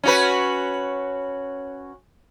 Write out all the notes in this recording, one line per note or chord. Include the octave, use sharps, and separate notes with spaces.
C#4 F#4 B4